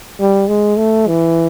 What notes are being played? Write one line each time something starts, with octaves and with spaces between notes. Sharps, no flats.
G3
G#3
A3
E3